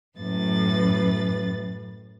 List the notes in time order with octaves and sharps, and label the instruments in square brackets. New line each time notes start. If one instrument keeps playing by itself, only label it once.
[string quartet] F#2 A2 B4 A6